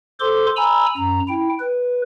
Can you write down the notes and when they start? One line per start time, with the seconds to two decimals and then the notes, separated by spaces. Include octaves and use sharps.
0.20 A4 C5 C6 D6
0.56 G#5 A#5 B5 E6
0.97 F#2 A#5
1.28 E4 G5
1.60 B4